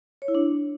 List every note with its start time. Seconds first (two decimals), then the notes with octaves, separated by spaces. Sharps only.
0.22 C#5
0.28 E4
0.35 D4